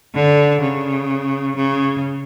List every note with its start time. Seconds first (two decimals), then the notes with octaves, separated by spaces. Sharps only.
0.14 D3
0.61 C#3
1.55 C#3